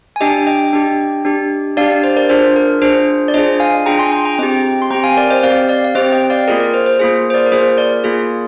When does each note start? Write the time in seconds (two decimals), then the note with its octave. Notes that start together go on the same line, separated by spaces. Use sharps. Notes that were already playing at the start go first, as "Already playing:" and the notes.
0.16 G#5
0.21 D4 G4 D#5 G5
0.47 D#5 G5
0.73 D4 G4
1.25 D4 G4
1.77 D4 G4 D5 F5
1.90 D5 F5
2.04 C5
2.17 A#4 D5
2.29 D4 F4 G#4 C5
2.56 A#4
2.82 D4 F4 G#4 C5
3.28 D5
3.34 D4 F4 G#4 C5 D#5
3.60 F5 G#5
3.86 D4 F4 G#4 G5 A#5
3.99 G#5 C6
4.12 G5 A#5
4.25 G5 A#5
4.38 C4 G4 D#5 G5
4.82 C6
4.91 C4 G4 G5 A#5
5.04 F5 G#5
5.17 A#4 D5
5.30 C5 D#5
5.43 C4 G4 D5 F5
5.69 D5 F5
5.85 F5
5.95 C4 G4 C5 D#5
6.12 D#5 G5
6.30 D5 F5
6.48 A#3 F4 G#4 A#4 D5
6.60 A#4
6.74 C5
6.86 C5
6.99 A#3 F4 G#4
7.30 C5
7.34 A#4 D5
7.46 A#4
7.52 A#3 F4 G#4 C5
7.77 A#4 D5
8.04 A#3 F4 G#4